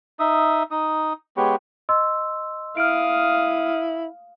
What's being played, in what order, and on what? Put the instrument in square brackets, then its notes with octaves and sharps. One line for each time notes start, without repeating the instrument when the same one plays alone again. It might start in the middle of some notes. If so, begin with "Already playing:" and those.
[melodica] D#4 E5 D#6
D#4 D#6
G#3 B3 G4 C#5
[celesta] D#5 C6 E6
[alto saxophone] E4 [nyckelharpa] F5 D#6 [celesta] F6 D7